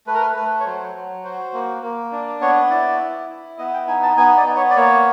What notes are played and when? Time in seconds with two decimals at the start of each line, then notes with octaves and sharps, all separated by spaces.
0.07 A3 B4
0.14 A#4
0.22 B4
0.36 A3 B4
0.60 C#5
0.65 F#3 C5
0.95 F#3
1.24 F#4 C5
1.53 A#3
1.83 A#3
2.12 D4
2.41 B3 C#5
2.70 E4 D5
3.00 E4
3.29 E4
3.58 B3 D#5
3.74 G5
3.87 D#4 G#5
4.03 A5
4.17 B3 G#5
4.37 D5
4.47 B3
4.56 C#5
4.70 D5
4.76 A#3 C#5